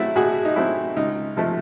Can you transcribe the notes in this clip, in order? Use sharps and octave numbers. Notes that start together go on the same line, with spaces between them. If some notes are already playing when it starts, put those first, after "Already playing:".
Already playing: F#3 A3 C4 E4 F#4
A2 F#4 G#4
D#4
F#3 A3 C4 E4
C#2 D#4
C3 F3 A3